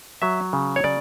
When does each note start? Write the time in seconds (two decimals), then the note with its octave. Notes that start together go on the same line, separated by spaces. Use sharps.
0.22 F#3 E5
0.53 C#3
0.76 C#5
0.84 C#3 D5